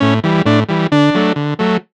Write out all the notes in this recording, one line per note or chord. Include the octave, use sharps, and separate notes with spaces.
A2 C#4
E3 G3
A2 D4
E3 G3
D3 D4
F#3 A3
D3
F#3 A3